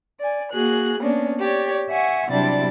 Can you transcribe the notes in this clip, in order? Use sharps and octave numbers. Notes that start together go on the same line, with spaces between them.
D5 G#5
A#3 F#4 G#4 F#6
A#3 B3 C#4 D4
G4 C#5 D5
E5 F#5 G#5 C#6
C3 F#3 G3 D4 E4 A6